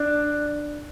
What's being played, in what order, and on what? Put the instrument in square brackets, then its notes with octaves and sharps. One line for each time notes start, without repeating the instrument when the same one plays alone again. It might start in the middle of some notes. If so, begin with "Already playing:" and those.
Already playing: [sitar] D4